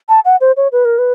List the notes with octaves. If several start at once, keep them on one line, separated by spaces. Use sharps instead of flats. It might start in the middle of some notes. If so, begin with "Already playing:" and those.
A5
F#5
C5
C#5
B4
A#4
B4